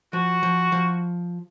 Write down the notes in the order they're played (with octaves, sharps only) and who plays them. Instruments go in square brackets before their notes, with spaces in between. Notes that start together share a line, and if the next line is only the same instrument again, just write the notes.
[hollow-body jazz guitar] F3 [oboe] F#4
[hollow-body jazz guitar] F3
F3